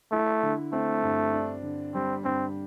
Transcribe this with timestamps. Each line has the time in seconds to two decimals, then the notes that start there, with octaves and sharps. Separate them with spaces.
0.11 A3 E4
0.43 D3
0.72 A3 C4
1.03 G2
1.34 D4
1.63 D3
1.94 G3 C4
2.24 G2 C4